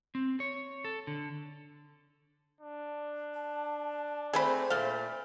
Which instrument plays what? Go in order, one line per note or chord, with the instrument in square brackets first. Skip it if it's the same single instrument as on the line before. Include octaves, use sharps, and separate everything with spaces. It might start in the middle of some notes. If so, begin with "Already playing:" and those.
[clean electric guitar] C4
C#5
A4
D3
[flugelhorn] D4
[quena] A5
[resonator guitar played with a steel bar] A3 C4 [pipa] G#4 B5 [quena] C5
[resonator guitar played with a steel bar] A#2 A3 [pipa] F5